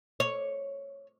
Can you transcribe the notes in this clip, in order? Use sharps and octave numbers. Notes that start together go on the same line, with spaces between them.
C#5